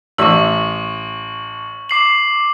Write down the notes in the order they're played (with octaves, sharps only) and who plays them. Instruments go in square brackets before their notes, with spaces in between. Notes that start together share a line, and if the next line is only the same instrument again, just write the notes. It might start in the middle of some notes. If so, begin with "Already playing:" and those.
[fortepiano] A1 E5 E6 [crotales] C#6 F#7
[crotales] D6 C7 F#7